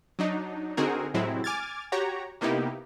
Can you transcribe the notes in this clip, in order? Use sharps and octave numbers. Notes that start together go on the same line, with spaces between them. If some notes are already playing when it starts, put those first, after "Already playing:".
F#3 D4 D#4
D3 C4 D#4 F#4 G#4 A#4
A2 C3 F#3 G#3 C4 E4
G#5 D6 F6 G#6 A6
F#4 G4 C#5 A#5
C3 A#3 B3 D#4 E4 G4